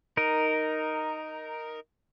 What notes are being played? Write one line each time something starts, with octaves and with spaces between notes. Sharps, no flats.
D#4 A#4